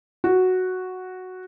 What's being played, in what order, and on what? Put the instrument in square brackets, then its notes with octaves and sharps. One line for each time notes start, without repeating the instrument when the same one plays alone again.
[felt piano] F#4